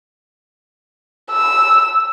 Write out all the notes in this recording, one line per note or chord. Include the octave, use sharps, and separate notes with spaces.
E6